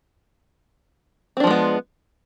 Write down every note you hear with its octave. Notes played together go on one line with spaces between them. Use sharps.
F3 G#3 B3 C4 D4